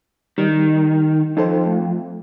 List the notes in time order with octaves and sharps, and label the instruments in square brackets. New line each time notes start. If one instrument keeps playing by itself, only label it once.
[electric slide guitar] D#3 [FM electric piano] G3
[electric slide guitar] F2 [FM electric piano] D#4 A4 C5
[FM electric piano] A3